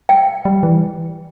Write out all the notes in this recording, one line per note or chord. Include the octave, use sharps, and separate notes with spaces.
G5
G3
E3